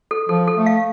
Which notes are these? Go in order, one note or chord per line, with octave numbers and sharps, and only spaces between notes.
A4
F3 A4
A4
A3
F5